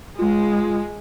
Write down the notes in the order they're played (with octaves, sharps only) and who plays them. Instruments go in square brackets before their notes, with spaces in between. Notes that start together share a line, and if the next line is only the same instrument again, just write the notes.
[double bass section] G#3 [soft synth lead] F4